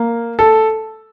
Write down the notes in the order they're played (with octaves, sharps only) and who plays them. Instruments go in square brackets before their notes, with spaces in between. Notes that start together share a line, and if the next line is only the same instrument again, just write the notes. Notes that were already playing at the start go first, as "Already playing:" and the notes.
Already playing: [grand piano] A#3
A4